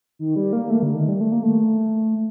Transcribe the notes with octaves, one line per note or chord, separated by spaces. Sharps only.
D#3
G3
A#3
A3
D3
D#3
G3
A3
A#3
A3